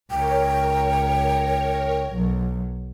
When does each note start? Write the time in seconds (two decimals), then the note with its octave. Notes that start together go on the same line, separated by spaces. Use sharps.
0.11 C#2 A#4 C#5 G5
2.14 B1 F#3